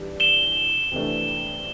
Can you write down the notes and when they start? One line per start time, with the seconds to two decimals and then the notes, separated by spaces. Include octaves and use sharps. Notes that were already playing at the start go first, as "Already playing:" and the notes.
Already playing: E3 G3 D4
0.20 E7 G7
0.92 C3 E3 A3 D4